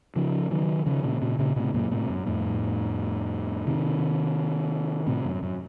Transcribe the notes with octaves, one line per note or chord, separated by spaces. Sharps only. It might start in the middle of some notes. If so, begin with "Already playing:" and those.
C#3 F3
D#3 F#3
C#3 F3
A#2 C#3
A#2 C#3
A#2 C#3
A2 C3
F#2 A#2
A2 C3
F#2
F2 A2
C3 D#3
A2 C3
F#2
F#2